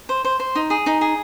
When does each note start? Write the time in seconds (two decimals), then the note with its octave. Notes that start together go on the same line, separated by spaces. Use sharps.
0.09 C5
0.25 C5
0.40 C5
0.55 D#4
0.70 G#4
0.86 D#4
1.01 G#4